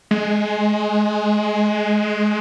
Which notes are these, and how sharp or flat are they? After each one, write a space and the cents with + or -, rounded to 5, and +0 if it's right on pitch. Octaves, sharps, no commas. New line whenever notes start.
G#3 +15